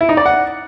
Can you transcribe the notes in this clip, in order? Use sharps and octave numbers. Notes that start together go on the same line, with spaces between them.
E4
D#4
D5
F#5